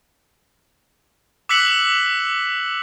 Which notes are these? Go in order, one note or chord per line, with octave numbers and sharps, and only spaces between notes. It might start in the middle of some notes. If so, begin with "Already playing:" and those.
D6 E6 F#6 B6 C#7 F#7